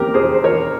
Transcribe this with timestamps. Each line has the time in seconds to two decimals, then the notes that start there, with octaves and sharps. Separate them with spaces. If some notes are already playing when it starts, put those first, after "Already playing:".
Already playing: F2 A#3 G4 A#4
0.14 G#4 C5
0.34 C5
0.44 A#4 C#5